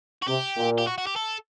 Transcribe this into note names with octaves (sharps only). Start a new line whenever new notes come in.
F#4
C3 G4
A#2
G4
F#4
F#4
G4
A4